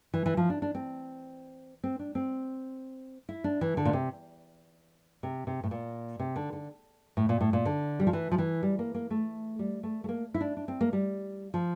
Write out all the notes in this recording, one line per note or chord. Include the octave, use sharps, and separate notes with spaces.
E3
E3
F3
D4
D4
C4
C4
D4
C4
E4
D4
E3
D3
A#2
C3
C3
C3
A2
A#2
C3
D3
D3
A2
A#2
A2
A#2
D3
G3
F3
E3
F3
E3
G3
A#3
A#3
A3
G3
A3
A3
A#3
E4
D4
D4
C4
A#3
G3
F3